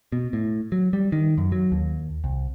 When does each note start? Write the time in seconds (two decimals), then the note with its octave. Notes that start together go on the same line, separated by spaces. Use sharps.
0.12 B2
0.33 A2
0.72 F#3
0.93 G3
1.12 D#3
1.38 F#2
1.52 F#3
1.72 D#2
2.24 C2